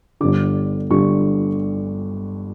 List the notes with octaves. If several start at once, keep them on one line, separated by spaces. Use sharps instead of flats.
G1 G2 D3 D6
G1 G2 D3 C#6